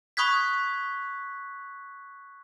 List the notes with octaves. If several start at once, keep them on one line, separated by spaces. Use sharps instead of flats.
B5 C#6 D#6 F#6 G#6 B6